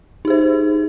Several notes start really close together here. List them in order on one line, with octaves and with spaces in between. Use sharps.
D#4 G#4 C5